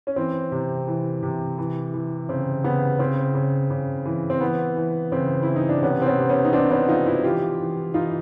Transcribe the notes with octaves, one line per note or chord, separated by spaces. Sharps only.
C#4
E3 C4
C3
E3
C3
E3
E3
C#3 C4
C#3 B3
C#3 C4
C#3
C#3
E3
C4
E3 B3
E3
C#3 C4
E3 E4
D#4
D4
C3 B3 C#4
C4
B3 C#4
C3
B3 C#4
D#4
C3 C4 D4
B3 C#4
F3 D#4 F4
E4 F#4
E3 F4 G4
E3
E3 D#4 F4